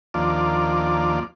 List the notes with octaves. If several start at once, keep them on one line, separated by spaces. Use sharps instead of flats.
D#2 F3 A#3 D4 F4 D5